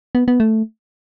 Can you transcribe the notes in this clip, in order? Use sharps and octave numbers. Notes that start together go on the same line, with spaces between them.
B3
B3
A3